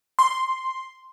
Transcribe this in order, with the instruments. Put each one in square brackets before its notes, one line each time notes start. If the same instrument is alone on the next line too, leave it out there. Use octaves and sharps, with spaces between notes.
[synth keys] C6